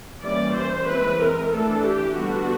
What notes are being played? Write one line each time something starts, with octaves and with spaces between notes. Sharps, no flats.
E3 G3 A#3 C#4 D5
C5
E3 G#3 C4 B4
A#4
E3 A3 D4 A4
G4
D3 G3 B3 D4 F#4